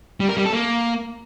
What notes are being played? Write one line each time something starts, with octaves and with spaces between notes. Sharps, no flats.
G3
A#4
G3
A4
A#3